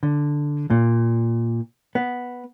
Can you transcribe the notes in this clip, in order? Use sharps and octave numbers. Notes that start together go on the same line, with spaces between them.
D3
A#2
B3